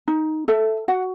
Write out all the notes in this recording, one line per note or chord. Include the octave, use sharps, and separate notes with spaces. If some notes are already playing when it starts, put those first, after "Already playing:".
D#4
A4 E5
F#4 F#5